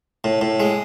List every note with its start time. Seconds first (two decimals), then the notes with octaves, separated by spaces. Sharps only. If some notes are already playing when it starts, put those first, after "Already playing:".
0.24 A2
0.41 A2
0.60 G#3